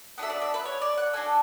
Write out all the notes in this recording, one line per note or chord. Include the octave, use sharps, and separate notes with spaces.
B3 D4 F#4 A4 E5
D5
E5
B4
C#5
D5
F#5
D4 F#4 A4 G#5